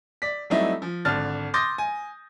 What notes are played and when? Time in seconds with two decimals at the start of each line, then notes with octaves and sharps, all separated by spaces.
0.22 D5 B6
0.50 F#3 G3 A3 C4 D#4 E4
0.82 F3
1.05 G#1 D3 A5 F6 A6
1.54 C6 D6 D#6 G6 A6 A#6
1.78 G#5